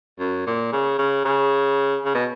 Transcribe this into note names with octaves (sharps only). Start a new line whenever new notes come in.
F#2
A#2
C#3
C#3
C#3
C#3
B2